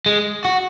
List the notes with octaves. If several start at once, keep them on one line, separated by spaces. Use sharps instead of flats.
G#3
F#4